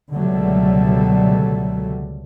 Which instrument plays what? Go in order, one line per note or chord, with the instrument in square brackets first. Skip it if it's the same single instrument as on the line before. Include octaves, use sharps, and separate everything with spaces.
[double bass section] C#2 B2 D3 F#3 G3 A3